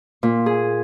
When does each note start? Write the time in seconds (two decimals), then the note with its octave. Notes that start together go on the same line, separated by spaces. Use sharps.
0.23 A#2
0.46 G#4